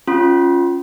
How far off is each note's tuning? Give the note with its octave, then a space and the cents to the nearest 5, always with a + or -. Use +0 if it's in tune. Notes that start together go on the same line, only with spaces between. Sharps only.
C#4 +0 F4 +0 C6 +0